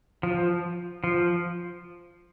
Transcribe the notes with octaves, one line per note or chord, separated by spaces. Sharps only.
F3
F3